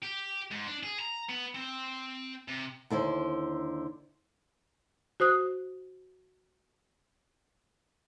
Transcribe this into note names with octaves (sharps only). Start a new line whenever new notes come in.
G4
G#2
D4
G#4
A#5
B3
C4
C3
D#2 D3 E4 C5
F#4 C5 D#6 F#6